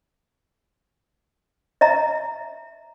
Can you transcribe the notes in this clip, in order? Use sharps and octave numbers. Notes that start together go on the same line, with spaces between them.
D#5 E5 A#5